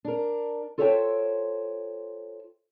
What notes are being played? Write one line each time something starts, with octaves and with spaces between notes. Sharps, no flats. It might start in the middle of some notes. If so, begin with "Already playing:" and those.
D4 A#4
F4 A4 C5 C#5 E5 G5